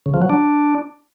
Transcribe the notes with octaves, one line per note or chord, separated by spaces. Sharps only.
C#3
F3
F#3
D4